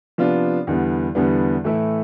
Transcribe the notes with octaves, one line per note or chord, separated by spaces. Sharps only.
C3 F3 B3 D4 F4
E2 D3 G3 B3
E2 D3 G3 B3
A2 E3 A3 E4